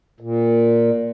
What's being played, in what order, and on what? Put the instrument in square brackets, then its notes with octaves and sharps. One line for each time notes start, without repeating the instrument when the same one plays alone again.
[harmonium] A#2